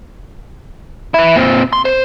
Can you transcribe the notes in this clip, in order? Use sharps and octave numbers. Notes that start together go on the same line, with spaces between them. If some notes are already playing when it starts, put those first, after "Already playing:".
E3 E4
A#2 C4
C6
C5